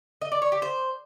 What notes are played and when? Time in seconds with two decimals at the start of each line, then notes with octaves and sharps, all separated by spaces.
0.22 D#5
0.32 D5
0.42 C#5
0.52 G4
0.62 C5